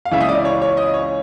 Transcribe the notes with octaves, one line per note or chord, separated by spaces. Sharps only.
F5
C#2 C#3 E3 E5
D#5
D5
C#5
C#5
D#5
C#5